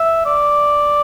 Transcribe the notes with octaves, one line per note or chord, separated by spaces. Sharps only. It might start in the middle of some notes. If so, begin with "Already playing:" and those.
Already playing: E5
D5